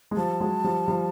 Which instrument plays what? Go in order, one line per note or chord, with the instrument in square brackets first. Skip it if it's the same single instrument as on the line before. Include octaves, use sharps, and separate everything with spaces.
[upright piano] G#3
[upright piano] F3 G3 [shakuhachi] A5
[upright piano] F#3 G#3
F3 G3
F3 G3